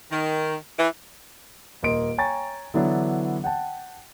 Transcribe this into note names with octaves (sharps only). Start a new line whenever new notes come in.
D#3
E3
D#1 A#3 A#4 D#5 C6 D7
C#5 G5 G#5 A#5 C#6 A6
D3 E3 F#3 B3 D4 E4
F#5 G5 A5